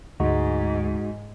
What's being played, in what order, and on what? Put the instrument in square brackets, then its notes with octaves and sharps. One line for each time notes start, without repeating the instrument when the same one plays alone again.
[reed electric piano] D2 [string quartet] G#2 [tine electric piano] G#3 D#4 F#4